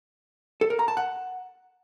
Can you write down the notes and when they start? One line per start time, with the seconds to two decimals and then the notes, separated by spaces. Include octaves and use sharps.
0.61 A4
0.70 A#4
0.79 A#5
0.88 A5
0.97 F#5